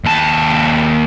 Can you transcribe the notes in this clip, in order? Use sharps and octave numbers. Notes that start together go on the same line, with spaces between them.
D#2 A5